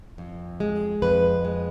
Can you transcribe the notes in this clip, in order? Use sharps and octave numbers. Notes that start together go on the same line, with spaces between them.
F2
G#3
F2 B4
G#3